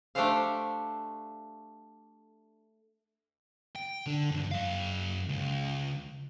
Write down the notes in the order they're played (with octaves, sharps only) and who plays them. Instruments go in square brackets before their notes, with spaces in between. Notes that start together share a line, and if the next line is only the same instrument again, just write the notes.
[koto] A3 D4 G4 A4 C5 F5
[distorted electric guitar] G5
D3
C#2 G2
F#2 F5
C#2